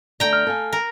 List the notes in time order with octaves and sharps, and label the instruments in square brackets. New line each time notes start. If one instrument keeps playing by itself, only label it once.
[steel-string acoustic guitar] D3 A3 [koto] G5 A#5
[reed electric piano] F6
[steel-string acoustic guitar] A4 F5 G#5
[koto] A#4